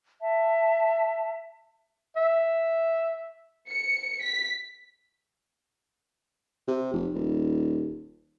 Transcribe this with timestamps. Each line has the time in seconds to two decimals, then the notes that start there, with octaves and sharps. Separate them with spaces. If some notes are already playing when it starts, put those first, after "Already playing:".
0.21 E5 A5
2.16 E5
3.69 C#7
4.23 B6
6.68 C3
6.93 F1
7.14 D#1